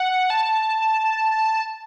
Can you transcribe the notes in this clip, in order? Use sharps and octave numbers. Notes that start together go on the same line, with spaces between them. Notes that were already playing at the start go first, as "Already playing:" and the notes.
Already playing: F#5
A5